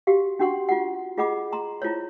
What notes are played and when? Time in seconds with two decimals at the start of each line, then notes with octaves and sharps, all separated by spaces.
0.07 F#4 G4 F5
0.39 C#4 D4 F#4 F#5 C6 C#6
0.69 F4 F#4 F#5
1.17 F4 G#4 D#5 F#5 B5 D6
1.53 A#5 C6
1.82 E4 F4 C5 C#5